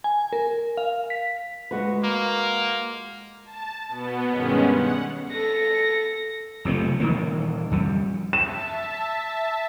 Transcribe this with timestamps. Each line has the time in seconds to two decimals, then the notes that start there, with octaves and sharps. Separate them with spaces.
0.04 G#5
0.33 A#4
0.77 F5
1.10 B6
1.71 G#3 F#4 B4
2.04 A#3
3.45 A5
3.88 B2 B3
4.30 G2 D#3 G#3 B3 C#4
4.73 F#5
5.31 A4 A#6 C#7
6.65 F#1 C3 F3 A3
7.00 D#1 D#3 E3 A#3
7.71 F2 G3
8.33 E5 A5 E7